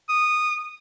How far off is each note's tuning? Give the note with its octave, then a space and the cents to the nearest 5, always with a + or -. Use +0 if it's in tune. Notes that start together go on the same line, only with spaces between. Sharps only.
D#6 -15